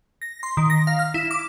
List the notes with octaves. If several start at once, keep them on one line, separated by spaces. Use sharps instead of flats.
A#6
C6
D#3
A#6
F5
F6
E4
D6